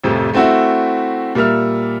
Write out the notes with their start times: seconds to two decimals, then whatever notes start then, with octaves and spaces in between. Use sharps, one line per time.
0.04 A1 F2 C3 A3
0.33 A3 C4 E4 F#4 E5
1.35 A#2 G3 A#4 E5 F6